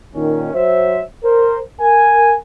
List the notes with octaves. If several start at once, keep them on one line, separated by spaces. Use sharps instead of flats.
A#2 D#3 C#4
F#3 C5 E5
A#4 C5
A#4 G#5